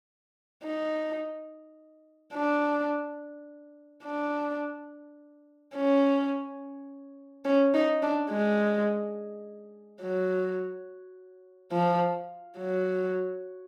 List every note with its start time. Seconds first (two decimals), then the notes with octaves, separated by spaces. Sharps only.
0.64 D#4
2.34 D4
4.04 D4
5.75 C#4
7.45 C#4
7.74 D#4
8.02 D4
8.30 G#3
10.01 F#3
11.72 F3
12.58 F#3